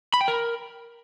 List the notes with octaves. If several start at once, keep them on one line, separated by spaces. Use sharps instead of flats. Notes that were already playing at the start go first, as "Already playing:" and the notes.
B5
G5
A#4